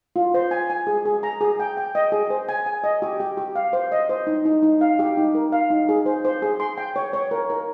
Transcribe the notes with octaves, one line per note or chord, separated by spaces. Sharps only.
F4
C5
G#5
G#5
G#4
G#4
A#5
G#4
G5
G5
D#5
G#4
C5
G#5
G#5
D#5
G4
G4
G4
F5
C5
D#5
C5
D#4
D#4
D#4
F5
G4
D#4
A#4
F5
D#4
G#4
C5
C5
G#4
C6
G5
C#5
C#5
A#4
A#4